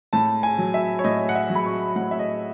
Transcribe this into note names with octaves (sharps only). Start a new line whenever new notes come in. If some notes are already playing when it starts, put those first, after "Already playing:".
A2 A5
G#5
F#3
E5
C#5
A2 D#5
F#5
E5
F#3
B5
C#6
A2 F#5
E5
D#5